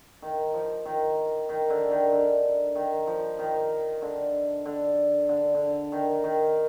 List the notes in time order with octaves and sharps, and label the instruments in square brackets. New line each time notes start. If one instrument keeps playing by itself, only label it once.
[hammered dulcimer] D#3
F3
D#3
D#3
D3
D#3
D3
D#3
F3
D#3
D3
D3
D3
D3
D#3
D#3